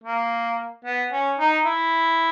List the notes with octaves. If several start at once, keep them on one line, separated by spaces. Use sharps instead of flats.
A#3
B3
C#4
D#4
E4